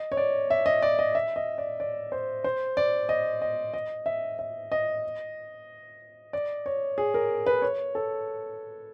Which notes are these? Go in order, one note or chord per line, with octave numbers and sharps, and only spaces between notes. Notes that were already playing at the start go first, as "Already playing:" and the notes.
Already playing: D#5
C#5
D5
E5
D#5
D5
D#5
E5
D#5
D5
D5
C5
C5
D5
D#5
D#5
D#5
E5
E5
D#5
D5
C#5
G#4
A#4
B4
C#5
A4